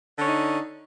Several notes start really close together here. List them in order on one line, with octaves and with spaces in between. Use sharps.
D3 C#4 D#4